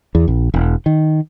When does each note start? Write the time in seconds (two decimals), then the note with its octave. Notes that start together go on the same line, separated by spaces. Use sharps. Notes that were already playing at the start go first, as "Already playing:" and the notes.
0.15 E2
0.28 A#1
0.54 E1
0.86 D#3